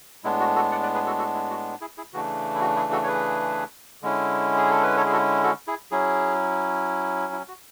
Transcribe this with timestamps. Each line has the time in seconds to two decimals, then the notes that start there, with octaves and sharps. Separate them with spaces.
0.24 A2 G#3 B3 D4 E4
0.40 F#4
0.56 F#4 A4
0.71 D5 F#5
0.83 B4 D5
0.95 G#4 B4
1.06 F#4 A4
1.18 F#4 A4
1.34 E4
1.50 F#4
1.81 E4 G#4
1.97 E4 G#4
2.13 C#3 E3 A3 D4 F#4
2.55 E4
2.61 F#4
2.76 E4 G#4
2.92 F#4 A4
3.03 C#5
3.07 G#4 B4
4.02 D3 G#3 C#4 E4
4.57 G#4
4.70 A4
4.83 B4
4.97 A4 C#5
5.06 G#4
5.12 F#4 A4
5.44 F#4 A4
5.67 E4 G#4
5.91 F#3 C#4 E4 G#4
7.33 E4
7.48 F#4